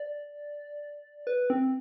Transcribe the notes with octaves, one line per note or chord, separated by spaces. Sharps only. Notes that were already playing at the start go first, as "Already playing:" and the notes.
Already playing: D5
B4
C4